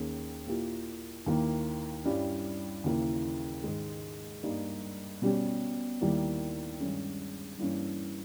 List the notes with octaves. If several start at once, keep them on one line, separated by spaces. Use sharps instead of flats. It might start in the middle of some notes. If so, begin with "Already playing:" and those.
Already playing: D#2 D#3 A#3 C#4 G#4
A#2 A#3 E4 G4
D#2 D#3 A#3 E4
G2 G3 C#4 E4 G4
D#2 C#3 E3 A#3 E4
G#2 D#3 G#3
G2 G3 A#3 D#4
B2 G3 C#4 G4
D#2 D#3 G3 A#3 E4
G2 D#3 G#3 C#4
G2 E3 A#3 C#4